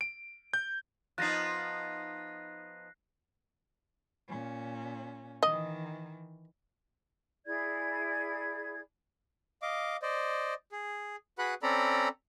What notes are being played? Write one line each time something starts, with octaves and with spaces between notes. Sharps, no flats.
D7
G6
F3 B3 D#4 F#6 A#6 C7
A#2 C#4
D#3 E3 D#5
E4 G#4 D5 G#6
D#5 F5 D6
C5 D5 D#5
G#4
F#4 G#4 B4 F#5 B5 F#6
C4 C#4 A4 D5 A#5 B5